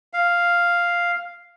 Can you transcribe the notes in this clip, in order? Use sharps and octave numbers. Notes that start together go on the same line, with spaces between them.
F5